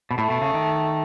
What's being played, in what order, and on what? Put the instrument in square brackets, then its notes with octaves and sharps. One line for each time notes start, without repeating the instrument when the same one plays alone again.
[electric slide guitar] B2
[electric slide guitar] A2 [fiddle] A3
[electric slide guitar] B2
C#3
D#3